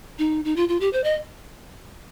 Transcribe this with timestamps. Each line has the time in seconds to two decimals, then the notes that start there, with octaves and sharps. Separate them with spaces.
0.19 D#4
0.45 D#4
0.56 F4
0.69 F4
0.80 G4
0.93 C5
1.04 D#5